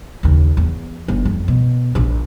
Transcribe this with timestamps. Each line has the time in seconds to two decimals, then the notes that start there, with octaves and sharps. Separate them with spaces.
0.23 D#2 C#3
0.57 E2
1.08 G1
1.25 F2
1.48 B2
1.95 A#1 D4